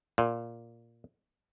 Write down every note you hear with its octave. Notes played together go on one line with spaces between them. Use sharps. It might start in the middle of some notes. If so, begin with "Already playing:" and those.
A#2